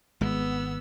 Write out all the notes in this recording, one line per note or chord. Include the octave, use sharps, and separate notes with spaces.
G#1 G#3 B3 E6